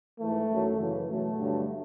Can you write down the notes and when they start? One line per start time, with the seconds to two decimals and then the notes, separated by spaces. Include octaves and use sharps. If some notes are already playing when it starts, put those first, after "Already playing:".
0.20 G#2 E3 A3
0.51 F#2 D#3 F#3
0.80 F#2 C#3 E3
1.09 B2 F#3 A3
1.39 G2 D3 F#3